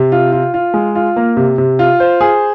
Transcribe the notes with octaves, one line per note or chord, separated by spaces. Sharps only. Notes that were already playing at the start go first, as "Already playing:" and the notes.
Already playing: C3
F4
F4
F4
G#3
F4
A#3
C3
C3
F4
C5
G#4